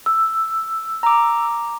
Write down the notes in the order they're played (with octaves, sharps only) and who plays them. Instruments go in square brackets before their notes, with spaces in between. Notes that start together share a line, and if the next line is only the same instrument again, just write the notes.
[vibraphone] E6
[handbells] A#5 D6